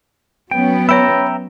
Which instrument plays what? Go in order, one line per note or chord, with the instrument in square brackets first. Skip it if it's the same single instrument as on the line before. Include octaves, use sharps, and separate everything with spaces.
[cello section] F#3 B3 C#4 [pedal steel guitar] G5
[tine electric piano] C#5 B5 [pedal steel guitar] E5 G5 A#5